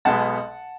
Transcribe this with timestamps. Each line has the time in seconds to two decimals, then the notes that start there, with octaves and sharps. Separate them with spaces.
0.05 B1 B2 G#3 B3 F#5 A5